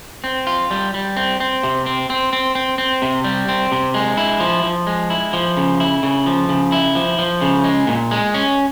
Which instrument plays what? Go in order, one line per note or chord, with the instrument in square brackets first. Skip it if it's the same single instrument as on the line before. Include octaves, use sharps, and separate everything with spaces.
[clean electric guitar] C4
F4
G3
G3
C4
C4
C3
C4
C4
C4
C4
C4
C3
G3
C4
C3
G#3
E4
F3
F3
G#3
E4
F3
C#3
E4
C#3
F3
C#3
E4
F3
F3
C#3
G#3
A#2
G#3
C#4